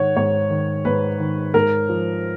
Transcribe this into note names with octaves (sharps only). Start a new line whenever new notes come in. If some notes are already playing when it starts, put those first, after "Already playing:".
Already playing: G#2 D#3 C#5 F#5
G#2 C#5
D#3
G#2 B4
D#3
G#2 A#4
F3